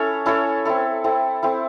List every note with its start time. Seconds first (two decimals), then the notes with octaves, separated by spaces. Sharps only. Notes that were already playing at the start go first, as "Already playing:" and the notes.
Already playing: C#4 E4 A4 C#5
0.26 C#4 E4 A4 C#5
0.65 C4 E4 A4
1.04 C4 E4 A4
1.43 C4 E4 A4